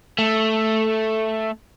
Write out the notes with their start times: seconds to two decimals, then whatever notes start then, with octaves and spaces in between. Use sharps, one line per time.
0.19 A3